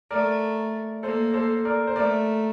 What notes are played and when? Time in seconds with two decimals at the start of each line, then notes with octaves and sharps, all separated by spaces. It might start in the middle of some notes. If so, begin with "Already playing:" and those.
0.11 A3 A#4 D5
1.03 A#3 A4 C5
1.34 A4 C5
1.65 A#4 D5
1.87 C5
1.96 A3 A#4 D5